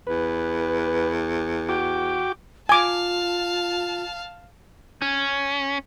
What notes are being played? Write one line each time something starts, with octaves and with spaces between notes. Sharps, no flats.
E2 B4
F#4 G5 D6
F4 F5 G#5 A5 D6
C#4